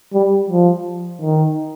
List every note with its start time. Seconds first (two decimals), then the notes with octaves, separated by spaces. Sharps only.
0.13 G3
0.49 F3
1.22 D#3